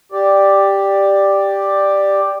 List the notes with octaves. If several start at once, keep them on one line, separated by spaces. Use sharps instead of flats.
G4 D5